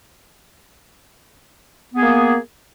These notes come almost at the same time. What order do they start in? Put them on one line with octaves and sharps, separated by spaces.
B3 G#4 A#3